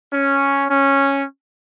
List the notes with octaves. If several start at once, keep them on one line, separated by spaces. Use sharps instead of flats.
C#4
C#4